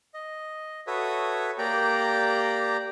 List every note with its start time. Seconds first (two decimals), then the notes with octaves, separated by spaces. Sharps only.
0.14 D#5
0.87 F#4 A4 B4 C#5 E5 D#6
1.58 A#3 G4 D5 G5 A#5